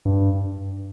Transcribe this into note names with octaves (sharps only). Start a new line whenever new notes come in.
G2